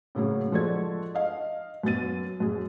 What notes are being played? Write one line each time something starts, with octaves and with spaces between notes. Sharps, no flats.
A2 C#3 F#3 A#3
F3 G#3 F#4 A4 D5 G#6
D#5 F5
F#2 B3 A6 D#7
F#2 G#4